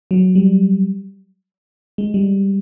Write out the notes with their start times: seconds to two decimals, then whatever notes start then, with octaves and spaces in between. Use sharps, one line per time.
0.11 F#3
0.35 G3
1.98 G#3
2.14 G3